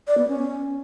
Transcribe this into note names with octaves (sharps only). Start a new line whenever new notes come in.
D5
B3
C#4